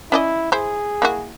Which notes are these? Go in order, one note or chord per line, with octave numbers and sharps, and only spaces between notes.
C#4 E4 D5 D#5
E4 G#4 C5
A#3 E4 F#4